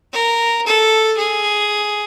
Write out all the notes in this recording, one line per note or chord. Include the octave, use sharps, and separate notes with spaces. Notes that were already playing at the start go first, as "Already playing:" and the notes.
A#4
A4
G#4